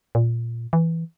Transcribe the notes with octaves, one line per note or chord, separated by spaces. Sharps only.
A#2
E3